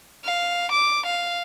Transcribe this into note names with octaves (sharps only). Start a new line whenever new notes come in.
F5
D6
F5